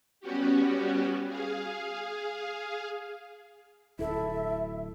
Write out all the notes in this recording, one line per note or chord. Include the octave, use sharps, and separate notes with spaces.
G3 B3 C#4 F#4 G4
G#4 F5
D1 E4 A4 E5